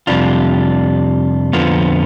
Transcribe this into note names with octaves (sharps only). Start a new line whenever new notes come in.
F2 C3 G3 D4 F4
F2 D3 F3 B3 F4